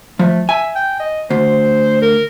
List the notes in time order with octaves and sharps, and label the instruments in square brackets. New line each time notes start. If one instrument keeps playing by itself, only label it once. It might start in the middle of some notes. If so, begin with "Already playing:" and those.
[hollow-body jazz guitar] F3 [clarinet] A3
[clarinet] E5 [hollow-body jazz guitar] G#5
[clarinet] G5
D#5
[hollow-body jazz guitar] D2 [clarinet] C5
[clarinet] A#4